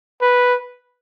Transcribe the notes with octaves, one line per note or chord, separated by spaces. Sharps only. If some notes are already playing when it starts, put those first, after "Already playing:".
B4